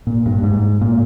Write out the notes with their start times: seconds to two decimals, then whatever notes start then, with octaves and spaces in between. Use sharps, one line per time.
0.07 A#2
0.26 G2
0.43 G#2
0.81 A#2